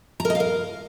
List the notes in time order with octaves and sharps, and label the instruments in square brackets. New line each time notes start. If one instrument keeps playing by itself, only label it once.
[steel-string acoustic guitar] A#5
A#4
D#5
F5
A#4